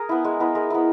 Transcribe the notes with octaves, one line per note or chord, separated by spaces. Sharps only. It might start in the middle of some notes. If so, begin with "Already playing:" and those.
Already playing: G#4 A#4
B3 E4
G#3
B3 E4
G#3 A#4
B3 E4